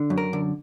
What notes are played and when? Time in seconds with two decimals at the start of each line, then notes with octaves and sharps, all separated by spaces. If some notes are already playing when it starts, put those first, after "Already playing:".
Already playing: D3
0.10 F#2
0.18 A#4
0.33 D3